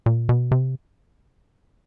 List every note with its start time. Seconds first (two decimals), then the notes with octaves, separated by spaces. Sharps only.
0.06 A#2
0.29 B2
0.51 C3